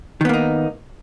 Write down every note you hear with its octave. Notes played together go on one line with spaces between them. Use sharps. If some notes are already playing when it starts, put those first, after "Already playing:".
D#3 A#3 B3 D#4